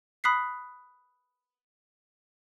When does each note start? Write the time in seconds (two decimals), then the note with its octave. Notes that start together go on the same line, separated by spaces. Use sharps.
0.24 B5 D#6 F#6 B6 C7